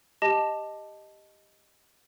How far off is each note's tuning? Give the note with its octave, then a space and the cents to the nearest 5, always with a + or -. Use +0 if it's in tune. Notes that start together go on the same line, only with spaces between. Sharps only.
G4 +5 D#5 +0 A5 +0